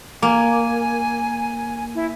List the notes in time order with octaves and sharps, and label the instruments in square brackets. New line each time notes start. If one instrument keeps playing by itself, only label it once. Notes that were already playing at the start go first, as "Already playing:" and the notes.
[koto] A#3 [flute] G#5
[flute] E4